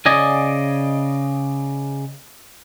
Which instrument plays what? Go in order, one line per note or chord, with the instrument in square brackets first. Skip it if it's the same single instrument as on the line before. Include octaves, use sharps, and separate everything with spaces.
[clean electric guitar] C#3 D5 D#5 G#5